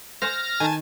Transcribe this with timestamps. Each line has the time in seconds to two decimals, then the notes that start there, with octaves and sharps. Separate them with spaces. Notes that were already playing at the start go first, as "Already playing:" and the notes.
0.22 C5 F#5 G#5 F6 A#6
0.60 D#3 G#5 A5